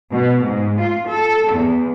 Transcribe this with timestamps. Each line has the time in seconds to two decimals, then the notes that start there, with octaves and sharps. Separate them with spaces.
0.12 B2
0.45 G#2
0.79 F4
1.09 A4
1.54 E2